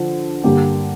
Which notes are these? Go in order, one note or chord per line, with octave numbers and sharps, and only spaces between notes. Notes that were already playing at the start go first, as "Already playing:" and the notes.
Already playing: D3 F3
G2 D3 A#3 G4